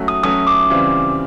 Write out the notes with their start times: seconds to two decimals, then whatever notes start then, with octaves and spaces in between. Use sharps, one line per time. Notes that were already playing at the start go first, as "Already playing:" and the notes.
Already playing: F#3 A3 C#4 F#4
0.08 D#6
0.23 F#3 A3 C#4 F#4 D#6
0.47 D6
0.70 C#3 E3 G3 C4 F4